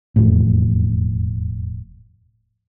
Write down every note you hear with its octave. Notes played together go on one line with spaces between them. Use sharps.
E1 F2 A2